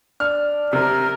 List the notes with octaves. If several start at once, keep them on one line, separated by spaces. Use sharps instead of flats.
D4 F6
C3 A#4